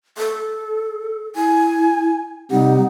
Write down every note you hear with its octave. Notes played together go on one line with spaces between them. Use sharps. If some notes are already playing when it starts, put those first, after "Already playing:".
A4
E4 G#5
C3 G3 D#4 F#5